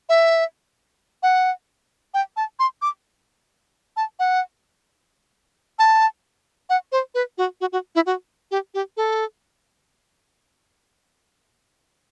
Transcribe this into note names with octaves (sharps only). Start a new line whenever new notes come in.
E5
F#5
G5
A5
C6
D6
A5
F#5
A5
F#5
C5
B4
F#4
F#4
F#4
E4
F#4
G4
G4
A4